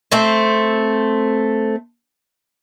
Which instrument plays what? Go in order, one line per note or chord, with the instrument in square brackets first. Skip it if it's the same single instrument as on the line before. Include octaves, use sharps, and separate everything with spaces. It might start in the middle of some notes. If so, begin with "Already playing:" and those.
[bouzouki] A3 C4 C5